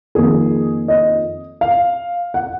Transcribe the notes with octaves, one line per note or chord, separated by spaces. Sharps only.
F2 D#3 A#3 G#4
D#5
F5
F#5